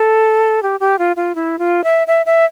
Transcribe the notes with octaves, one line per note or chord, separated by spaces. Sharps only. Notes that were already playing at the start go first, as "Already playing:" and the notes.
Already playing: A4
G4
G4
F4
F4
E4
F4
E5
E5
E5